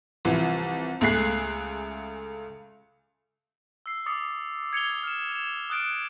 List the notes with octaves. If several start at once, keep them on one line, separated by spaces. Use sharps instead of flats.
C2 E3 F3
C#2 A3 G#4 F#6 C7
E6 C7
D6 D#6 A6 C#7
G#6 C#7 F7 G7
F6 E7
E7
D#6 F6 F#6 A6 D7